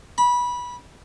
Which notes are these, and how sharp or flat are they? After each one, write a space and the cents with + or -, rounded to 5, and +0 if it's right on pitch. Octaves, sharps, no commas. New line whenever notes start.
B5 -20